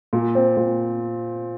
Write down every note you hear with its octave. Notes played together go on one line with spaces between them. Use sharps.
A#2
C4
A#2